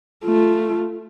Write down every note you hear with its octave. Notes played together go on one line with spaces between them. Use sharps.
A3 F4